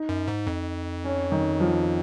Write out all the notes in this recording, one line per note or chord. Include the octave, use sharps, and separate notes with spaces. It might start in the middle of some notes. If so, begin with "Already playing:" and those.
Already playing: D#4
F#2
G#2
F2
C#4
D#3
F3